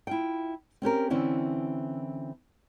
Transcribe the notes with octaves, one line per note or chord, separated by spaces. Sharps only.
E4 F4 G5
C4 C#4 G4 A#4
D3 E3 C4 C#4 E4